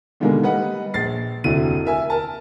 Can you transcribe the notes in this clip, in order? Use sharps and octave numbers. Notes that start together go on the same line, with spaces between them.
B2 D3 D#3 G3 G#3 A#3
G3 B4 D#5 F#5
A#1 A6 C7
F1 D2 D3 E4 F#4 D#7
A#4 E5 G#5
A#4 A5